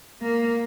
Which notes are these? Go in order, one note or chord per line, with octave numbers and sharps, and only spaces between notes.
A#3